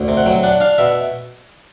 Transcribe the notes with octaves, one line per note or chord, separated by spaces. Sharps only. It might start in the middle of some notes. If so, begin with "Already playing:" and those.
Already playing: D2
C3
F#5
F#3 G5
D4 F#5
D4 F5
B2 E5